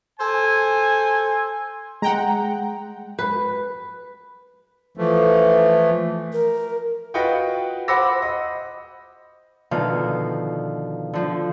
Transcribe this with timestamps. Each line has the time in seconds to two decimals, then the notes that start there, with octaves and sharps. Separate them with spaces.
0.20 A4 C5 G#5
2.02 G#3 F#5 G5 A#5
3.19 B4
4.97 E3 F3 A3
6.33 A#4
7.14 F4 F#4 B4 D#5 F#5 G5
7.88 C5 F#5 B5 D6 E6 A#6
8.22 D#5
9.71 B2 D3 D#3 F3 F5
11.13 D3 F3